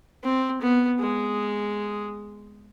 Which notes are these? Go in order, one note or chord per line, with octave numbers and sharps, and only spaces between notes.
C4
B3
G#3